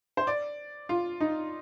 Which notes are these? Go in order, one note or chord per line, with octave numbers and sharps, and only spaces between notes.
C5
D5
F4
D#4